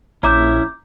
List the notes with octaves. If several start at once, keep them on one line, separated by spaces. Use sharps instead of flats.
A#1 C#4 E4 E5 A#5 D6 G6